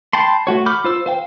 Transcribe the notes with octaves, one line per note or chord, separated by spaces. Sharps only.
G5 A5 B5 C6
A3 F#4 C#5
B5 D6 F6 G6
F4 C5 E6
C5 F5 G5